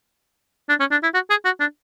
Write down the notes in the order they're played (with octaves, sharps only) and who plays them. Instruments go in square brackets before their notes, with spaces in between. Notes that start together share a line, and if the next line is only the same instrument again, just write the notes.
[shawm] D4
C#4
D4
E4
F#4
G#4
F#4
D4